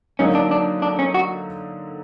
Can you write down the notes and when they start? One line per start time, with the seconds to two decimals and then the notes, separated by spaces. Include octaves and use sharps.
0.19 D3 F#3 A#3 C#4 D#4
0.35 D4
0.51 D4
0.82 D4
0.99 C#4
1.14 F#4